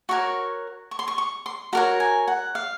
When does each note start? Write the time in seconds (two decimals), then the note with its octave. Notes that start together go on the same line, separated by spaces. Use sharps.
0.09 F#4 A#4 C#5 C#6
0.91 C#6
0.99 C6
1.08 C#6
1.18 C#6
1.46 C6
1.73 F#4 A#4 C#5 A#5
2.00 G#5
2.28 F#5
2.55 F5